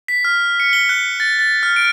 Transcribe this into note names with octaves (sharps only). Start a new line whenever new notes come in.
B6
F6
C#7
G7
F#6
A6
A6
F6
D7